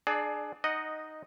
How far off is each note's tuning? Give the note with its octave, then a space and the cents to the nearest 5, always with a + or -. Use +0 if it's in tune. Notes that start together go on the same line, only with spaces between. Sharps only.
D4 +25 G#4 +25 D5 +0
D#4 +0 D#5 -10 F#5 +0